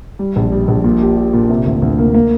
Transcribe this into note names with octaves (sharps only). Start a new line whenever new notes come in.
G3
A#1
G3
A#1
A#2
G4
G4
A#2
C3
D2
D2
A#3
A#3